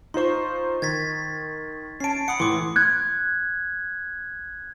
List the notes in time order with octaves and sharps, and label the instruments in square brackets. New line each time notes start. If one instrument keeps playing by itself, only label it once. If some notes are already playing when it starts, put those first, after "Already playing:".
[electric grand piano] D#4 F4 C5 [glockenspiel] C6 C#6
[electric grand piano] D#3 [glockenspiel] G#6 A6 B6
[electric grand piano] C#4 A5 [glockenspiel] C7 D7
[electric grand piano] F#5 [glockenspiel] B5 D#6 C#7
[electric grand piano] A2 E3 [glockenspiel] C6 D6
[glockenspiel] F#6 G#6